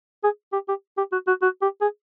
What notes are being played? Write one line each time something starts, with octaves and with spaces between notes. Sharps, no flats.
G#4
G4
G4
G4
F#4
F#4
F#4
G4
G#4